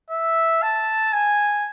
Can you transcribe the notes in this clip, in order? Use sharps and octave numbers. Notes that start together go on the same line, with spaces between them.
E5
A5
G#5